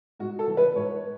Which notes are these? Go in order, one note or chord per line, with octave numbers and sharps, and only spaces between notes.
G#2 F#4
A4
E3
B4
G#2 C#5